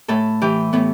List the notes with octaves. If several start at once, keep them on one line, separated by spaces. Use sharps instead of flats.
A2 A4
E3 G4
A2 B3